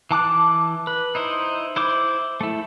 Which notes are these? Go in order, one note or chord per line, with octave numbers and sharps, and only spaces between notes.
E3 A5 D6 F#6
B4
D#4 E4 C5
E4 C5 D6
A3 E4